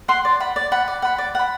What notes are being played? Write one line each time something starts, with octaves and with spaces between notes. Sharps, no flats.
F#5 C6
D5
F#5 B5
D5
F#5 B5
D5
F#5 B5
D5
F#5 B5